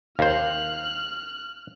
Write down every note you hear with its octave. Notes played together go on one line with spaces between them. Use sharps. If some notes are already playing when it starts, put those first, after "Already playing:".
D#2 C5 F5 F6 F#6